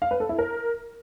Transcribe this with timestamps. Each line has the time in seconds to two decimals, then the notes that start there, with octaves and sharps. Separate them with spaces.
0.02 F5
0.11 B4
0.20 A4
0.29 E4
0.38 A#4